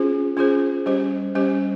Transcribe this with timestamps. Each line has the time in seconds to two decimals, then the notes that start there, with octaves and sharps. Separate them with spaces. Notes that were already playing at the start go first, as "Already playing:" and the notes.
Already playing: C#4 F4 G#4 C5
0.37 C#4 F4 G#4 C5
0.86 G3 C#4 G4 C5
1.35 G3 C#4 G4 C5